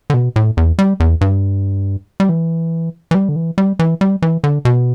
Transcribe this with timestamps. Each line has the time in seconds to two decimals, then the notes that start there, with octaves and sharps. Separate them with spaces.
0.10 D3
0.14 B2
0.36 A2
0.57 E2
0.79 G3
1.00 E2
1.21 G2
2.20 G3
2.29 E3
3.11 E3
3.15 G3
3.29 D3
3.36 E3
3.58 G3
3.79 E3
4.01 G3
4.22 E3
4.44 D3
4.65 B2